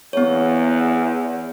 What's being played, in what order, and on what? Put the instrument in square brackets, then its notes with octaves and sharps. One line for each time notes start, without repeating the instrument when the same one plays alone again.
[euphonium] E2 [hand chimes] B3 C#5